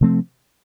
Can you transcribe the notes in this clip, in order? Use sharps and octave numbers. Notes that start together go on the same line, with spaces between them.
C3 F3 A3 C4